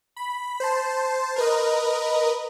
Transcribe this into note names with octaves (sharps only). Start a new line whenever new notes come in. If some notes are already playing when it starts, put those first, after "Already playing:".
B5
C5 A5
A#4 B4 D#5